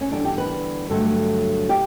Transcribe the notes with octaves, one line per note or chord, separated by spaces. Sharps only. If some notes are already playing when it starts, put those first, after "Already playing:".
C#4
E2 D3 G3 D4
G4
B4
G2 D3 F#3 A3 A4
G4